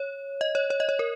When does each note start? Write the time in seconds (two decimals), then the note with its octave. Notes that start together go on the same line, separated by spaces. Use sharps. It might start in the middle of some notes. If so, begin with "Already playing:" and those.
Already playing: C#5
0.41 D#5
0.55 C#5
0.70 C#5
0.80 D#5
0.89 C#5
0.99 A#4